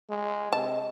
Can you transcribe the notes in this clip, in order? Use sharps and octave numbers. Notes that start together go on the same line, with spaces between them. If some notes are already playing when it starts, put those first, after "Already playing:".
G#3
C3 D#5 A5